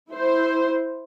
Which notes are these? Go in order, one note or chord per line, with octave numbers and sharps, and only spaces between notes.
E4 C5